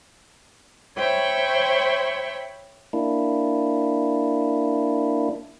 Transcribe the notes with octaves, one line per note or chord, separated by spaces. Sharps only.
C5 C#5 E5 G5 B5 C#6
A#3 D4 E4